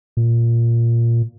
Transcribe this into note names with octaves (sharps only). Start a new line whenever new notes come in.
A#2